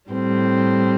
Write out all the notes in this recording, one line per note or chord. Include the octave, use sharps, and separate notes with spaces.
A2 G3 C4